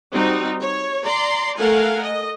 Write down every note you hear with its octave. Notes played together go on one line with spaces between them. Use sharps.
G3 C4 D#4 F#4
C#5
D5 A#5 C6
A3 A4 A#4 F5 F#5 G#5
D#5